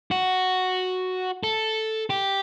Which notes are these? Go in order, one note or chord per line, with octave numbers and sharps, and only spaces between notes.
F#4
A4
G4